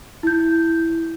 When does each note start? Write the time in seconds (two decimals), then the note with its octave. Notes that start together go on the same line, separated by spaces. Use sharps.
0.23 E4 G6